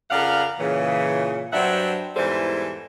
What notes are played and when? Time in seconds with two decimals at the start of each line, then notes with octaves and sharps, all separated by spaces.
0.11 F2 C#3 A#4 D5 F5 F#5
0.59 A#2 C#3 E3
1.53 G2 F#3 C4 D4 E5 F#5
2.16 E2 G#2 E3 G3 A4 C5